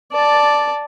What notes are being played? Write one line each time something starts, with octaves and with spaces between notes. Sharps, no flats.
D5 A5